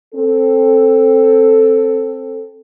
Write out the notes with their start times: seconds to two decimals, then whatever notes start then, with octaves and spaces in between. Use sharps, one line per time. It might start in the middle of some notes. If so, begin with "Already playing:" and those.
0.14 C4 A4